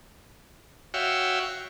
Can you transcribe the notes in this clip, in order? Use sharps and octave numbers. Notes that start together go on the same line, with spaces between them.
F#4 C#5 E5 F5 G5